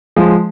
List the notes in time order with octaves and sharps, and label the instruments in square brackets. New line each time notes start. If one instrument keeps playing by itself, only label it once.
[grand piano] F3 G#3